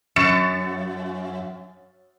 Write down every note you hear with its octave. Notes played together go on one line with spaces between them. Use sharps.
F#2 A6 C#7 E7